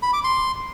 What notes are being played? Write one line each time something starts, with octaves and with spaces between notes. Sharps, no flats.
B5
D6
C6